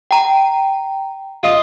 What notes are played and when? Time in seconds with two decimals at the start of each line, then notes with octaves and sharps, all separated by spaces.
0.11 G5 A#5
1.43 F4 D#5